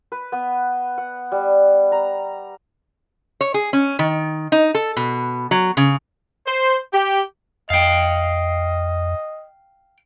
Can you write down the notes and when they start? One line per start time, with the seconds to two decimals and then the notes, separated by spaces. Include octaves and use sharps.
0.12 B4
0.32 B3
0.98 F#5
1.32 G3
1.92 A#5
3.41 C#5
3.54 G#4
3.73 C#4
3.99 D#3
4.52 D#4
4.75 A4
4.97 B2
5.51 F#3
5.77 C#3
6.47 C5
6.93 G4
7.70 F2 D#5 F5 G5